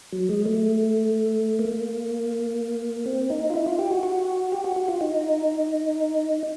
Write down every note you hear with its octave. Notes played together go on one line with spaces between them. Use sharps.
F#3
G#3
A3
A#3
C4
D#4
F4
E4
F4
G4
F#4
F#4
G4
F#4
F#4
F4
D#4